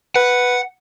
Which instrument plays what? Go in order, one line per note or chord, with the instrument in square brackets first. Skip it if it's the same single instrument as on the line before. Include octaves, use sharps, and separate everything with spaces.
[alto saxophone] B4 [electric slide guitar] F#5